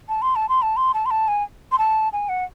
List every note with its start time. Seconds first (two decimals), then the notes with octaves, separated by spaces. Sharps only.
0.09 A5
0.22 C6
0.36 A5
0.49 C6
0.62 A5
0.77 C6
0.94 A5
1.06 C6
1.11 A5
1.28 G#5
1.72 C6
1.78 A5
2.13 G#5
2.29 F#5